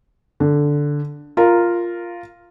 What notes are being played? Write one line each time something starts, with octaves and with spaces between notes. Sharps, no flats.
D3
F4 A#4